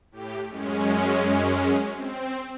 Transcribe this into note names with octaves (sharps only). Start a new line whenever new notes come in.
A2 G4
F#2 G#3 C#4
C4